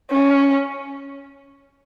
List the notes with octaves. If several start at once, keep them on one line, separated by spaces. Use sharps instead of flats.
C#4